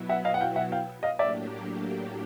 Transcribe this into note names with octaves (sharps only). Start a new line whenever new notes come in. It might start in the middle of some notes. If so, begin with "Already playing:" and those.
Already playing: B2 F#3 B3 E4
E5 F#5
D#5 F5
F#5
F5 G5
E5 F#5
F5 G5
D#5 F5
A2 F#3 A#3 D4 G4 D5 E5